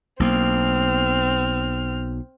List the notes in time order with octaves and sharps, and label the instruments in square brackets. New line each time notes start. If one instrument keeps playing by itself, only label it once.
[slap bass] B1 A#3 [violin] C4 F6